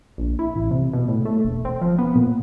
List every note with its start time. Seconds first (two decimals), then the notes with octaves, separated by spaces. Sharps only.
0.18 A#1
0.39 E4
0.56 A1
0.71 C3
0.93 B2
1.08 A2
1.25 A3
1.45 E1
1.65 C4
1.81 F3
1.98 B3
2.15 A#2